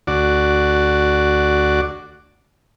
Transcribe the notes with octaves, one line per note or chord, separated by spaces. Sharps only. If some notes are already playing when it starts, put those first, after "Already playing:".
D2 F#4 D5